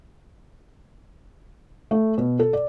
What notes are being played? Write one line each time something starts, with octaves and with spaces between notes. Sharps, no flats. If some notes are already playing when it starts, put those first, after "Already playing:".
A3
B2
A4
D5